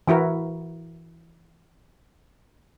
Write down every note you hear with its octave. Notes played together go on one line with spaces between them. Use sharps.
E3 E4 F#4 A#4